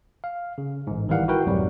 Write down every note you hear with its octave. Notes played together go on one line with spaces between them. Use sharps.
F5
C#3
A1 G#2
G#1 D#3 E3 G3 F5 F#5
E4 F#4 A#4 B4 G5
B1 F2 G#2 F#3 G3